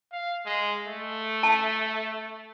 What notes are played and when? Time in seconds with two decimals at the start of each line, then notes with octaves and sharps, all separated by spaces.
0.13 F5
0.46 G#3
0.88 A3
1.43 A5